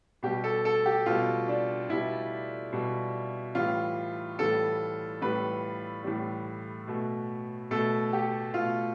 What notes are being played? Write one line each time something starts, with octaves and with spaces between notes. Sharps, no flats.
B2 G3 G4
A4
A4
G4
B2 G3 F4
D4
B2 G3 E4
B2 G3
A2 E3 G3 F4
A2 E3 G3 A4
A2 E3 G3 B4
A2 E3 G3
B2 A3
B2 A3 A4
G4
B2 A3 F4